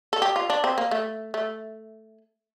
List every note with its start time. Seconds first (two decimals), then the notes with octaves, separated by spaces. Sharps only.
0.13 A4
0.22 G4
0.36 F4
0.50 D4
0.64 C4
0.78 A#3
0.91 A3
1.34 A3